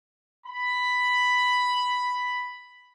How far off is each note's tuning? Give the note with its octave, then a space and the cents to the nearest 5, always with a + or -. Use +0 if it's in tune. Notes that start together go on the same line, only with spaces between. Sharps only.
B5 +5